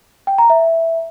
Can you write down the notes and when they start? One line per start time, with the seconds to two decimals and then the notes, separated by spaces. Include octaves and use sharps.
0.27 G5
0.38 A#5
0.50 E5